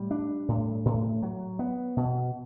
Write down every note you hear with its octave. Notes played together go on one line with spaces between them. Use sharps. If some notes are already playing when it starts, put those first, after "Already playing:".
Already playing: A2 G3
D4
A2
A2
F#3
B3
B2